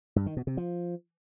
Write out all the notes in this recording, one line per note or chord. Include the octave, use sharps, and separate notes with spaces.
G2
D#3
B2
C3
F3